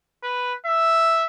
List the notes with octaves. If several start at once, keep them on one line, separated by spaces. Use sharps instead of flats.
B4
E5